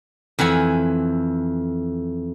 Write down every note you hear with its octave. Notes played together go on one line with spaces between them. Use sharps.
F2 E3 F#5 G#5